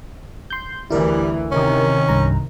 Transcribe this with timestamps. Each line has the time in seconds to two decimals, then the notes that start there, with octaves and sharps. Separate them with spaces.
0.50 C6 G6
0.90 D2 E3 G3 E4 A#4
1.51 C3 D#3 C#4
2.09 C2 G2 A#5